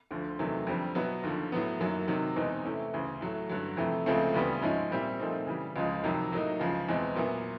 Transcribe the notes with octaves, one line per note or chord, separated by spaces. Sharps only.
D2 D3 F3
E2 C3 D#3 F#3 A3
F2 D3 G3 C4
B2 F#3 B3 E4
D#2 D3 F3
A2 F#3 B3
F#2 D#3 F#3 A#3
C3 D#3 F#3
E2 B2 G#3 C4 D#4
C3 E3 A3 C#4 E4
D2 C#3 E3
A2 F#3 A3
G2 D3 F#3
F2 C3 E3 A3
C#2 C#3 F3 A3 C4
D2 C#3 E3 G3 B3
G#2 F3 G#3 C#4 E4
A#2 G3 C4 E4
A#2 F3 A3 C4 D#4
C#3 E3 G3
C#2 C#3 F3 G#3
F2 C3 D#3 F#3
A2 F#3 A#3 D#4
C#2 C#3 F3
E2 B2 G#3 C4
A#2 F#3 B3 E4